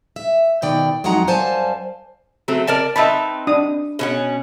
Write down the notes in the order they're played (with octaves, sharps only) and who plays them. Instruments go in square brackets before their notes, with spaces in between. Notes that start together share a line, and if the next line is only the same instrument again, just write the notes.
[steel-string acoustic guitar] E5
B2 D#3 D5 G5
F2 F#3 G#3 D#4 F#5 A#5
F#2 G3 C5 F5 G#5 A5
[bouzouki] F#3 A3 C4
A#4 D5 A5
[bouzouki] C4 D#4 B4 [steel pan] E5 A5
[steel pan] D4 D#6
[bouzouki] B2 C#4 F#5